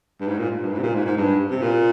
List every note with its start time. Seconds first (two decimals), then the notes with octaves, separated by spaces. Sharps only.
0.21 G2
0.28 G#2
0.39 A#2
0.61 G2
0.73 G#2
0.78 C3
0.83 A#2
0.95 G#2
1.06 G#2
1.17 G2
1.51 C3
1.62 A#2